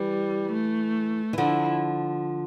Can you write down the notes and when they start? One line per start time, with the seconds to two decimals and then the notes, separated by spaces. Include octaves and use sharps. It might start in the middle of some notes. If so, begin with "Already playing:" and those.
Already playing: E3 G3
0.52 A3
1.33 E3
1.38 D3 F3 E4